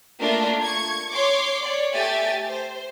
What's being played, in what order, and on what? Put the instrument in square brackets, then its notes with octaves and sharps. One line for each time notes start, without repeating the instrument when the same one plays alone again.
[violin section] A3 A#3 D4 F4 A#4
C#6 G#6
C#5 C6 D6
C#5 D5
A3 G4 E5 G5 G#5 A6
C5